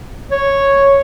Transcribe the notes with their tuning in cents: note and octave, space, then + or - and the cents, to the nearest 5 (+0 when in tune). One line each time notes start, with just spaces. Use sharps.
C#5 -5